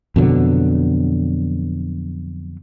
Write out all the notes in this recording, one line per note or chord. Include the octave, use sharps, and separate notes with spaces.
F2 B2 D3 F#3